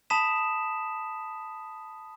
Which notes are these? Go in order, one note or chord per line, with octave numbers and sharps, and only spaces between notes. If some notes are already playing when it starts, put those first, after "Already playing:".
A5 B5 D#6 B6 E7